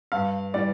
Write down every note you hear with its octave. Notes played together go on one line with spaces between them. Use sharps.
G2 F5
E3 G3 D5